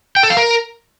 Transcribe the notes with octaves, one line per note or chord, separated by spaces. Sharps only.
G5
A4
F5
A#4